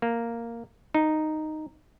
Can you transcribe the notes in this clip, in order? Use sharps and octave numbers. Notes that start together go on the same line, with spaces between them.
A#3
D#4